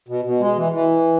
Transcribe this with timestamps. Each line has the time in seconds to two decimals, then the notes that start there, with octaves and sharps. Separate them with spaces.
0.08 B2
0.25 B2
0.40 G#3
0.56 E3
0.72 E3